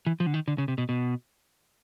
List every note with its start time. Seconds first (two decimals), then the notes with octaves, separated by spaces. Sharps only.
0.06 E3
0.20 F3
0.27 D3
0.34 D#3
0.48 D3
0.58 C#3
0.68 C3
0.78 B2
0.89 B2